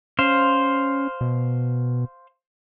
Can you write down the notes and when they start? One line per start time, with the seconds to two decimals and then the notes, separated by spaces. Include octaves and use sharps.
0.19 C#4 C5 F5
1.21 B2